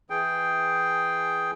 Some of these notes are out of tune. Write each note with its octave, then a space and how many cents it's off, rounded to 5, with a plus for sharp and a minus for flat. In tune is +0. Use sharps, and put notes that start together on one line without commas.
E3 +10 G#4 +5 G5 +0